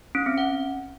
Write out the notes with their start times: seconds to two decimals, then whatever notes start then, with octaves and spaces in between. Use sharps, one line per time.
0.15 C#4
0.26 C4
0.38 F#5